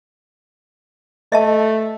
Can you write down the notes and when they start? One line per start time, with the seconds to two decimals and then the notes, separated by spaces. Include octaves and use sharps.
1.32 A3 D#5 E5 A5